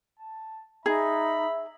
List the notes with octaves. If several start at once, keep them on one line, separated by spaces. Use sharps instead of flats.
A5
D#4 G#4 E5 B5